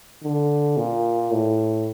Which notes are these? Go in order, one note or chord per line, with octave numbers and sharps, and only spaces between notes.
D3
A#2
A2